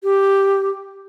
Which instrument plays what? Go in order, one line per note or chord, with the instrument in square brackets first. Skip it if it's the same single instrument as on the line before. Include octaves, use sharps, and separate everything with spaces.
[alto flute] G4